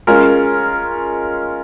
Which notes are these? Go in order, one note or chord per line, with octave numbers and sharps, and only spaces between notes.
G#3 C#4 F4 A#4